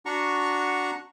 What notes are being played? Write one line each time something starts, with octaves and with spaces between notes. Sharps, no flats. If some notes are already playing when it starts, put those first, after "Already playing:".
D4 F#4 F#5 A#5 C#6